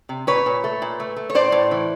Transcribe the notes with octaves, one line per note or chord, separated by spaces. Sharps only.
C3
A#2 B4 C#5
A#2
A3
A#2
A3
A3
C#5
A2 C5 D5
A2
E3